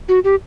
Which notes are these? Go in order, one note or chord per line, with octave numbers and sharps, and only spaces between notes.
F#4
G4